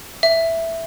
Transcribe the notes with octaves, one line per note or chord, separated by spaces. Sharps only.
E5